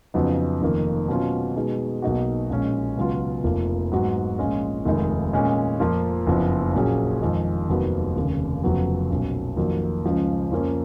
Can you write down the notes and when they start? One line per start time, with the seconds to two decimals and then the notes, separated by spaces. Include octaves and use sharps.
0.14 F2 C#3 F#3 B3 D#4
0.61 F1 F2 D#3 A#3
1.08 B2 F#3 C#4 F4
1.56 B2 G#3 D#4 G#4
2.02 B1 B2 A#3 D#4 F#4
2.50 A#1 A#2 G#3 C#4
2.97 C#2 B2 F#3 B3 F4
3.44 F1 F2 F3 A#3
3.92 G#2 F#3 B3 F#4
4.38 A#1 A#2 G#3 C#4 F4
4.85 F1 D#2 D#3 G#3 D#4
5.33 A#2 G#3 C#4
5.80 F2 F3 A#3 F4
6.27 F#1 F2 F3 B3
6.74 A#1 A#2 F#3 C#4 G#4
7.22 F2 D#3 G#3
7.69 F1 D#2 D#3 F#3 B3
8.16 F1 D#2 C#3
8.64 F1 F2 C#3 F#3 B3
9.10 B1 A#2 F#3 C#4
9.57 F2 D#3 F#3 A#3
10.04 C#2 C#3 F3 G#3
10.51 F2 F3 A#3 C#4